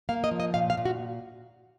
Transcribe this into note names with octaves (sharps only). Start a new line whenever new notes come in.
A#3 F5
D#5
F3
D#5
A#2 F5
F5
A#2
F#4